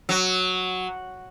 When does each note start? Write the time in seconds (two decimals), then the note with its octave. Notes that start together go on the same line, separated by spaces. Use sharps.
0.09 F#3